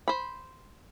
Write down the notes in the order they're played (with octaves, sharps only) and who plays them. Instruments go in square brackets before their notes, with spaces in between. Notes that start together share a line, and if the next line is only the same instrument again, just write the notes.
[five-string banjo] C5 B5